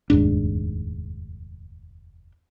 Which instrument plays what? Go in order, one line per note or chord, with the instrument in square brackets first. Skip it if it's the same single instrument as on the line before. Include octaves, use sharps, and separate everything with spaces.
[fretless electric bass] F1 D#2 G#2 D4